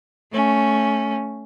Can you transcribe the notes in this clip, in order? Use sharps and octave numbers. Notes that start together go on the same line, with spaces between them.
A3 C#4